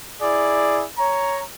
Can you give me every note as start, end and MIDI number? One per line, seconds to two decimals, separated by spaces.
0.21 0.85 64
0.21 0.85 68
0.21 0.85 74
0.97 1.42 73
0.97 1.42 82